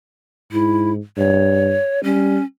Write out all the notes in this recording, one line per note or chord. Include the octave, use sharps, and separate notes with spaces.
G#2 E4
G2 C#5
G3 C#4